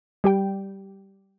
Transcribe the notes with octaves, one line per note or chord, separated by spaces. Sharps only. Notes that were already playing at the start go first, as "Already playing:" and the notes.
G3 G4 G5